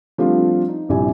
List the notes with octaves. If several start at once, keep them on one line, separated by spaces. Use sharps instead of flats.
F3 G3 A3 C4 D4 F4
D#4
A#1 G2 C3 E4 G4 G#5